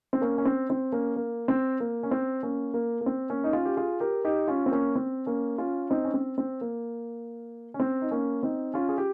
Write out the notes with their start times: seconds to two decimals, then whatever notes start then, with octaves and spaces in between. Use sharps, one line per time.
0.13 C4
0.21 A#3 C#4
0.38 C#4
0.45 C4
0.70 C4
0.92 A#3 C#4
1.16 A#3
1.48 C4
1.80 A#3
2.03 C#4
2.11 C4
2.43 A#3 C#4
2.74 A#3
3.01 A#3
3.06 C4
3.30 A#3 C#4
3.44 D#4
3.53 C#4 F4
3.65 G4
3.77 F4 G#4
4.00 G4 A#4
4.25 D#4 G4
4.48 C#4 F4
4.66 C4
4.71 A#3 C#4
4.95 C4
5.26 A#3 C#4
5.58 C#4 F4
5.90 C4 D#4
6.05 C#4
6.14 C4
6.38 C4
6.61 A#3
7.74 C#4
7.80 C4
8.02 D#4
8.11 A#3 C#4
8.42 C4 D#4
8.74 C#4 F4
8.89 G#4
8.98 G4